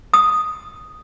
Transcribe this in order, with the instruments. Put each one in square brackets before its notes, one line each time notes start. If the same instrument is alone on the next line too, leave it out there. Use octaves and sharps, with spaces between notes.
[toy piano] D#6